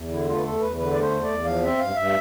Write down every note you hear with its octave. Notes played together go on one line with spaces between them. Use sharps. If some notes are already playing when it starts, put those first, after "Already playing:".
Already playing: E2
D3 E4
A3 F4
B4
E2 A4
E2 B4
D3 B4
A3 D5
C5
E2
D5
E2
F3 F5
C4 E5
G2 F5
G2 E5